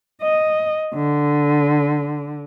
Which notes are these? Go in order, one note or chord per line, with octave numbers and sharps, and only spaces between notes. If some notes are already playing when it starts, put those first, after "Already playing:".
D#5
D3